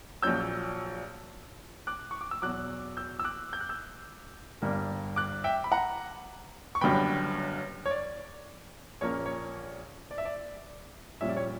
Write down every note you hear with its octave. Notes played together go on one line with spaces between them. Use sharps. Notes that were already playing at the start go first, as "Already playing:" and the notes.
A#1 A#2 F#3 C#4 E6 G6
D6 F#6
C#6
D6
E6
E2 B2 F#3 D6 F#6
E6 G6
E6
D6 F#6
G6
F#6
E6 G6
G1 G2 D3 G3 A#3
D6 F#6
E5 G5
B5
F#5 A#5
C#6
F#1 F#2 D3 G3 B3 G5 B5
C#5
D5
A#1 A#2 A#3 C#4 C#5
C#5
D5
E5
D5
A#1 A#2 G3 C#4 E5
D5
C#5